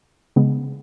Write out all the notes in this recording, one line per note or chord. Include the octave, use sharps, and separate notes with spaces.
C#3 G#3 B3